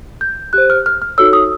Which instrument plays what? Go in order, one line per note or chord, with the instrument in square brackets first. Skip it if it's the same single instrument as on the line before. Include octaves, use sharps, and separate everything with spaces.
[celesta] G6
G4 C5 F#6
F6
F6
F6
D#4 F#4 A4 C#5 E6
D#6